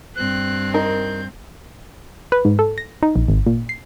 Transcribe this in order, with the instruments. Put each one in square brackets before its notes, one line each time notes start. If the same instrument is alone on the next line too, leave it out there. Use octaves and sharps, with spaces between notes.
[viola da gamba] G2 C4 [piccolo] F#6
[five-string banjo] D#4 A#4 [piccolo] G6
[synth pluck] B4
G#2
A4
A#6
D#4
A#1
G#1
A#2
C7